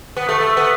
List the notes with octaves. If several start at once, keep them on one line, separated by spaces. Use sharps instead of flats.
B3
A3
A3
B3